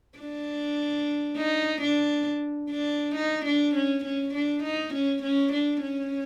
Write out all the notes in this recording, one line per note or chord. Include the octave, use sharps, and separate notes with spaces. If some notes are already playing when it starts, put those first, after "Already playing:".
D4
D#4
D4
D4
D#4
D4
C#4
C#4
D4
D#4
C#4
C#4
D4
C#4